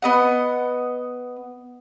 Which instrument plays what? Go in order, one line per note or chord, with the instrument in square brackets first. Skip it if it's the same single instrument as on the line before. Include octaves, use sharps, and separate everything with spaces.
[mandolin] B3 D#5 F#5